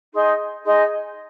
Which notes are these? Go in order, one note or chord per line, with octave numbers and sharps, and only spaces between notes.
D#4 G#4 D#5 C6
D#4 G#4 D#5 C6